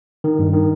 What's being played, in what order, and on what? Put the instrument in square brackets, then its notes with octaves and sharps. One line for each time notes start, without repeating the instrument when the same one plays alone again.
[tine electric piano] D#3
G2
D#3